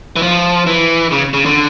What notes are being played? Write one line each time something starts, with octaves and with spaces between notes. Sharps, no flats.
E3
F3
E3
C#3
C#3
D3